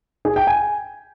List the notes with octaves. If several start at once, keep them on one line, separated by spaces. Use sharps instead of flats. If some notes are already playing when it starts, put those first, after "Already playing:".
G#4
G5
G#5